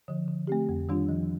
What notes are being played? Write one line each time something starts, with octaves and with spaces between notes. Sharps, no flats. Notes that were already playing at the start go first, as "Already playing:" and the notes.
D3 F3
D3
A3 C4 G4
F2
D#3 G3 D4 F4
F3